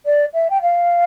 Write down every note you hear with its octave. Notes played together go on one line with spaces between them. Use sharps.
D5
E5
G5
F5